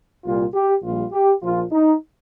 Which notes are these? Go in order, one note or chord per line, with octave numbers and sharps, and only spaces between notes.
C2 A#2 G3 F4
G4
A#1 A#2 G3 F4
G4
A#1 A#2 F3 F4
D#4